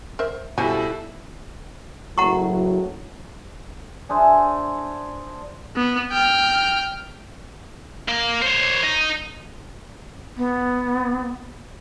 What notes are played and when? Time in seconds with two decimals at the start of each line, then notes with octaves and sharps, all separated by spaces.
0.19 A#4 C5 E5
0.58 B2 F3 G3 E4 A4 C5 G#5
2.18 F#1 A2 F#3 F#5 A#5 C#6
4.09 D4 G#4 C5 E5
5.76 B3
6.12 G5 F6
8.08 A#3
8.42 C5 C#5
8.83 D#4
10.37 B3